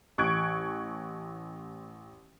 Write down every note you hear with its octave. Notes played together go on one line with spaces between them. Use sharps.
A1 C#6 F#6 G#6 D7